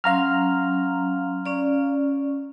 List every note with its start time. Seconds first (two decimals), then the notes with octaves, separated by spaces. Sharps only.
0.04 F#3 C#4 F5 A#5 C6 F6
1.46 C#4 D5